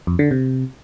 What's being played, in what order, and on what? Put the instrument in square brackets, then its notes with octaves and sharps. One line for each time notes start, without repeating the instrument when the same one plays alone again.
[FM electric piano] F2
D3
C3